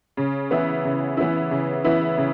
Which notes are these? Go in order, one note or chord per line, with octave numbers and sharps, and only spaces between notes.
C#3
E3 B3 E4
C#3
E3 B3 E4
C#3
E3 B3 E4
C#3